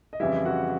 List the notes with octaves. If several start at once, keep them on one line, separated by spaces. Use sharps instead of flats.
D#5
F2 C#3 E3 G3 E4 E5
F#4 F#5